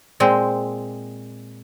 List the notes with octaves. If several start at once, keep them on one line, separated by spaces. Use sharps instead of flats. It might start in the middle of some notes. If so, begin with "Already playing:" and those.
A#2 G#3 C4